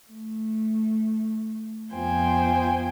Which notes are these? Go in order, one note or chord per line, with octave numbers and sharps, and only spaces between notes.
A3
F2 B3 F4 C5 G5 G#5